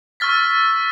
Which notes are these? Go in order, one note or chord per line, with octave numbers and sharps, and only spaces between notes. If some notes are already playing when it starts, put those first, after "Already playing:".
C#6 E6 F6 A6 B6